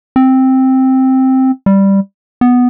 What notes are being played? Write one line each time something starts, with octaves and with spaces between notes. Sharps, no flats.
C4
G3
B3